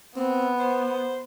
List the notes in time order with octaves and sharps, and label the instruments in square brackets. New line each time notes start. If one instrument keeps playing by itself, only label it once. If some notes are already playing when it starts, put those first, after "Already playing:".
[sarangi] B3 [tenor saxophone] C4
[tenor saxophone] C5